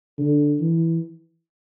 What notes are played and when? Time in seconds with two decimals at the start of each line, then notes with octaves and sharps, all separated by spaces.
0.18 D3
0.60 E3